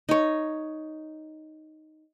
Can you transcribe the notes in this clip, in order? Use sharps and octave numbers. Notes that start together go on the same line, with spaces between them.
D#4 C#5